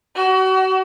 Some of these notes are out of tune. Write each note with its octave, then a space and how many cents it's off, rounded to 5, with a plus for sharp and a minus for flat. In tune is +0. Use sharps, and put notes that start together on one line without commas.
F#4 +35